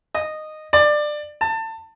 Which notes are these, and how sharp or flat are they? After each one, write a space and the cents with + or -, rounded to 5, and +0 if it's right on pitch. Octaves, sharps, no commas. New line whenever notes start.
D#5 -10
D5 +20
A5 +25